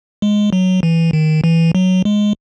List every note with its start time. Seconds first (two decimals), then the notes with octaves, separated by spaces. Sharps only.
0.22 G#3
0.53 F#3
0.83 E3
1.13 D#3
1.44 E3
1.75 F#3
2.05 G#3